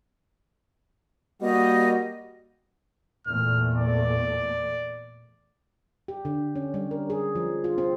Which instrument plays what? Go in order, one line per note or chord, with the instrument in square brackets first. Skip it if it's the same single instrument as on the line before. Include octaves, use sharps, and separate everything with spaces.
[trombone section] G3 A#3 F#4 [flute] D#5
[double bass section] E2 A#2 A3 [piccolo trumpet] F6
[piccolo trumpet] D5
[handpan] G4
D3
C#4
G3
A#4
G#4
F3
F4
C4